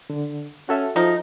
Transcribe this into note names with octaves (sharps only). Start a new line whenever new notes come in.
D3
C#4 F#4 A4 E5
F3 D#4